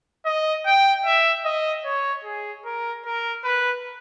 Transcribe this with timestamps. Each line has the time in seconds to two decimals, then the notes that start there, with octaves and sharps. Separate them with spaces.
0.25 D#5
0.66 G5
1.05 E5
1.45 D#5
1.85 C#5
2.24 G#4
2.65 A#4
3.05 A#4
3.44 B4